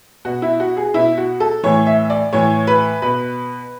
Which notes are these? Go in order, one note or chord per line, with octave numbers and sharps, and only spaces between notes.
B2 F#4
E4
F#4
G#4
B2 E4
F#4
A4
A2 E3 C#5
E5
D5
A2 E3 C#5
B4
B2 B4